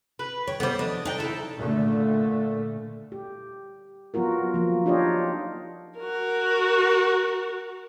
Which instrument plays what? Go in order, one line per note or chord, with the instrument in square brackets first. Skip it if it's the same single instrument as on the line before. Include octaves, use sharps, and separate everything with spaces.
[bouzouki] B4
[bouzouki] C#5 [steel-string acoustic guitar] G5
[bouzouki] G3 B3 [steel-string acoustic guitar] A4 C5
[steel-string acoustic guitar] F3 [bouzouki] D4 D#5
[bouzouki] D4 G5 [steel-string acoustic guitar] D#4
[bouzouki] E4 A4
[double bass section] A#2 D3 A3
[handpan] G4
F#3 B3 F4 F#4 A#4
F3 A#3
D4 D#4 F4 G4 C#5 D#5
[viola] F#4 A#4